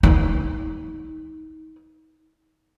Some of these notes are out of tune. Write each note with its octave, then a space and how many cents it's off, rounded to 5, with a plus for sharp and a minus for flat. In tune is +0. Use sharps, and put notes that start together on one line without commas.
D#4 +25